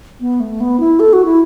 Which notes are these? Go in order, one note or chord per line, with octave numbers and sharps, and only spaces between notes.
B3
A3
B3
E4
A4
F#4
E4